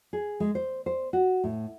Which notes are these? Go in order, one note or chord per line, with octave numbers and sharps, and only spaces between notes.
G#4
G#3
C5
C5
F#4
A2